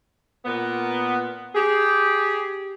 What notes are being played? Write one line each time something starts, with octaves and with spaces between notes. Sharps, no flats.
A#2 B3
G4 G#4